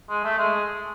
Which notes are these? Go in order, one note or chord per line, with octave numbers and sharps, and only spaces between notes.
G#3
A3
G#3